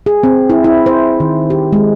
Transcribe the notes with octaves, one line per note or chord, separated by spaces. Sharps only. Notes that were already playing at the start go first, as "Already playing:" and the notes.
G#4
C4
E4
E4
C5
D#3
G4
G#3